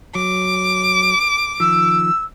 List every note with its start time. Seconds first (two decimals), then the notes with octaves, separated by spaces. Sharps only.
0.15 F#3 D6
1.60 D#3 F3 E6